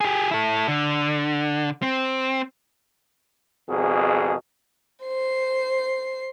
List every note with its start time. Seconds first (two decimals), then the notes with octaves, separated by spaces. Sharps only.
0.01 G4 G#4
0.31 E4 A4
0.68 D3
1.82 C4
3.69 G#1 F2 B2 G#4
5.05 C5 C7